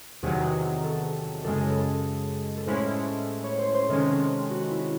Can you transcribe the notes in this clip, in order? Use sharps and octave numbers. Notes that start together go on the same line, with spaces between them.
E2 C3 D#3 F#3 G#4
A4
F#2 C#3 G#3 A4
G#4
A4
A4
A2 G#3 C#4 E4 C5
C#5
C5
C5
C3 D#3 G#3 C#4 A4
F#4
E4